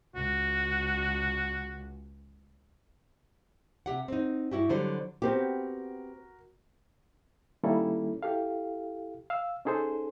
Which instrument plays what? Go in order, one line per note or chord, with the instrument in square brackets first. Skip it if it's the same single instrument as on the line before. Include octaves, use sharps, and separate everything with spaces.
[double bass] C#2 [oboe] F#4
[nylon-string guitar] C3 G4 F#5
C4 D#4
G2 E4 F#4 G4
D3 F#3 G3 C5
[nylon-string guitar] B3 C4 G4 [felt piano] F#4 A#4
[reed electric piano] D#3 G3 A#3 C#4 E4 A4
E4 G4 A4 F5
F5 E6
C#4 D#4 G#4 A4 C5